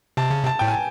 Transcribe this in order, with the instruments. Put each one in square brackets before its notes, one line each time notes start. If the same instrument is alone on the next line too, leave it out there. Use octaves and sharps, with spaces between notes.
[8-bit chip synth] C3 [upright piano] A5
[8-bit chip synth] C#3
C3
[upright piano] A5
[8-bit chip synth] A2 [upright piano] G5
[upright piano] G#5